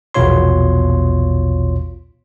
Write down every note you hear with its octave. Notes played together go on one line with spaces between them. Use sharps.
A#1 E2 B2 F4 C#5 C6